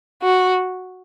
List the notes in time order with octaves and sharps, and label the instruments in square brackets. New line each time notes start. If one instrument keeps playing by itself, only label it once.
[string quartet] F#4